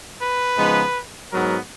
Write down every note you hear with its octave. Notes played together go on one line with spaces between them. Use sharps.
B4
C#3 F3 G#3 B3 D#4
G#2 F#3 B3 A#4